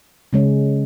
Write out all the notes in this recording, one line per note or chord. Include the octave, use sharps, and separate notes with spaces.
C#3 G#3 C#4